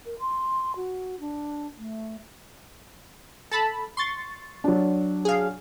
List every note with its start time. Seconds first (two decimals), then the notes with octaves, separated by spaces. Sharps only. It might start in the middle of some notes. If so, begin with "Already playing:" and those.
0.05 A#4
0.20 C6
0.76 F#4
1.20 D4
1.78 A3
3.51 A4 A5 B5
3.97 C6 C#6 A6
4.64 F#3 D4
5.25 G#4 F5